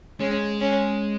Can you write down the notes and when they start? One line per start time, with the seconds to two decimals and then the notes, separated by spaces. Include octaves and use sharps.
0.20 G#3 C#4
0.61 C#4